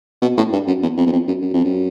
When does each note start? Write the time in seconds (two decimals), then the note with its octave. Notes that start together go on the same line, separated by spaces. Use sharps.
0.22 B2
0.38 A2
0.53 G2
0.67 F#2
0.83 E2
0.97 F2
1.07 E2
1.13 F2
1.28 F#2
1.42 F#2
1.54 F2
1.64 F#2